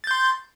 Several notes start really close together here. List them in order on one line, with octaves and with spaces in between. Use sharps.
A6 G6 C6